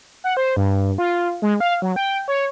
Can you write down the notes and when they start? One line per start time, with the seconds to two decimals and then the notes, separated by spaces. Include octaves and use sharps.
0.24 F#5
0.37 C5
0.56 G2
0.98 F4
1.42 G#3
1.60 F5
1.82 F#3
1.96 G5
2.28 C#5